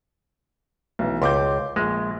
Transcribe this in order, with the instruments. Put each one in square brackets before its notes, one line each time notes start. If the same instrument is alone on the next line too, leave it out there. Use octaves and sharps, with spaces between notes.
[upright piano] B1 E3
[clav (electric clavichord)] C#2 [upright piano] C6 D6 G6
[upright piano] A#1 [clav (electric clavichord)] G#3